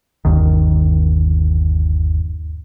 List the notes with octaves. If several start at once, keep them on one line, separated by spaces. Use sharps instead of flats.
G1 D#2 D#3